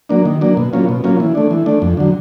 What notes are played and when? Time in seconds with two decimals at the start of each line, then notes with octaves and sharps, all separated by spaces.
0.09 F#3 A#3 D4
0.25 D#3
0.41 F#3 A#3 D4
0.57 B2
0.73 F#3 A#3 C#4 F4
0.89 B2
1.04 F#3 A#3 C#4 F4
1.20 E3
1.35 A3 D4
1.51 E3
1.66 A3 D4
1.82 F2
1.97 D3 F#3